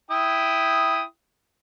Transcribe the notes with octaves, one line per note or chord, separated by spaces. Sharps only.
E4 G5 D#6